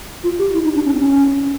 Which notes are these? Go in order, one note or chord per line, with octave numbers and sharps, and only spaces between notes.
F4
G4
E4
D#4
D4
C#4
C4
C#4